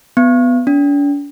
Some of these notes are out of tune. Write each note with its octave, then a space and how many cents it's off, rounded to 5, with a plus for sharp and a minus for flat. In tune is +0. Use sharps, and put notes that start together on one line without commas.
B3 +10
D4 -45